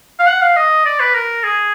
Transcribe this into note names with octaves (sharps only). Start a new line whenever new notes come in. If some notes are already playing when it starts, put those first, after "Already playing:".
F5
F#5
F5
D#5
D5
B4
A#4
G#4